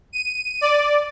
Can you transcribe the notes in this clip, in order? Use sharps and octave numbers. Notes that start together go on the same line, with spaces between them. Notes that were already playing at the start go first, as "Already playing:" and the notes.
D#7
D5